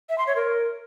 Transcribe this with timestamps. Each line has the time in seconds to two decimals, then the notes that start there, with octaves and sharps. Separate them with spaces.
0.09 E5
0.18 C6
0.27 C#5
0.36 A#4